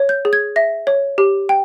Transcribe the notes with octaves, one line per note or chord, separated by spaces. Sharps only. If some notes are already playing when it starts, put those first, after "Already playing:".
Already playing: C#5
G6
G#4
G#6
E5 A#6
C#5
G4
G5